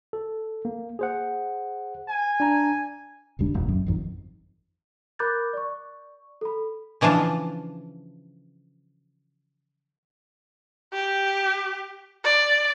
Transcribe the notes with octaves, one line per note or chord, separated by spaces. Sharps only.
A4
A#3
G#4 C5 F#5
G#5
D4 A#5
E1 C#2 G3 D4
F1 A#1 D#2
F#2
G#1 F2 D#3
A#4 B5 D6 F#6 G6 A6
D5 C#6
A4 B5
C#3 E3 F3 D4 F4
G4
D5